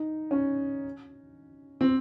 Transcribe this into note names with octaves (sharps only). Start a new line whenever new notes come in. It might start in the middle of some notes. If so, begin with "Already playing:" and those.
Already playing: D#4
C#4
C4